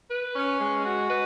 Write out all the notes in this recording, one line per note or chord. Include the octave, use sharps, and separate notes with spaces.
B4
C#4
G#3
F#4
B4